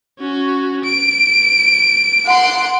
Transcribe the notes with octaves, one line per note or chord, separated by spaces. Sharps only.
C#4 F#4
D7
F#5 C6